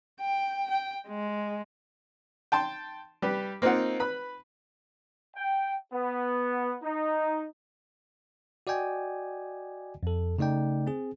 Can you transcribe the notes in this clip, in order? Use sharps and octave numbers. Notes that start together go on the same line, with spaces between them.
G5
G5
G#3
G5 A5 C6
G3 G4 B4
A#3 C4 D#4 F4 F#5
B4 B5
G5
B3
D#4
F#4 D5 D#5 G5 G#5
F2 A4
C#3 A3 D#4 D5 G5
C4 G#4